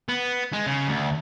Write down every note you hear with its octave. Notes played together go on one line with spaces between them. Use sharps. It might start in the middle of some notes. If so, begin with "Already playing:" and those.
B3
G#3
C#3
D2